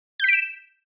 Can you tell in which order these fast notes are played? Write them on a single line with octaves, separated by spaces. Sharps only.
G6 B6 D7 E7